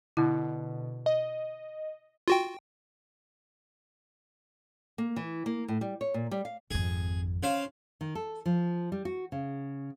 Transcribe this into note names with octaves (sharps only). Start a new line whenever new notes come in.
B2 D3 E4
D#5
F4 F#4 G5
A#3
E3
A#3
A2
G3
C#5
A#2
G3
F5
G#1 F2 G#4
C#3 C5 F5
D#3
A4
F3
G3
F#4
C#3